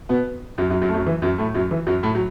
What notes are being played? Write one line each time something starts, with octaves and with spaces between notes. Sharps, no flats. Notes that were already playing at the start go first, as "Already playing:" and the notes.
B2 B3
F#2 F#3
F#2 F#3
F#2 F#3
A3
F#2 F#3
E3
F#2 F#3
A2 A3
F#2 F#3
E3
F#2 F#3
A2 A3
F#3